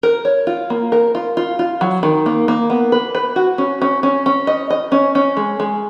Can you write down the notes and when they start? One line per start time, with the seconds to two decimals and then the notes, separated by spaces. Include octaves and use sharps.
0.03 A#4
0.25 C#5
0.47 F4
0.70 A#3
0.92 A#4
1.15 F4
1.37 F4
1.59 F4
1.81 F#3
2.03 D#3
2.26 A#3
2.48 A#3
2.70 B3
2.92 B4
3.15 B4
3.36 F#4
3.58 C#4
3.82 C#4
4.03 C#4
4.26 C#4
4.47 D#5
4.70 D#5
4.92 C#4
5.15 C#4
5.37 G#3
5.60 G#3